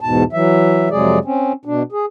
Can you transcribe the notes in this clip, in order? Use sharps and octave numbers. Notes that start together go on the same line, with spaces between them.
E2 G#2 B2 A5
E3 F#3 E5
F2 C3 F#3 G#3 G#4 D5
C4 C#4
B2 D4
G#4